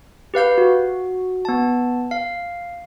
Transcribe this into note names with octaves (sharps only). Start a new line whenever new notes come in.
G4 B4 F5 G6
F#4
B3 A5
F5